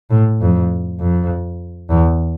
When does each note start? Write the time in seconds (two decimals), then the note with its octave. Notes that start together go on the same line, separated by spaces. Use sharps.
0.10 A2
0.41 F2
1.00 F2
1.90 E2